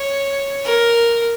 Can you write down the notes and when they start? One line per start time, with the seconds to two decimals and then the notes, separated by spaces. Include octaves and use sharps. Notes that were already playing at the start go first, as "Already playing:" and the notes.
Already playing: C#5
0.65 A#4